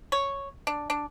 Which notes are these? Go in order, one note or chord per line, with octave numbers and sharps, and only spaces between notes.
C#5
D4
D4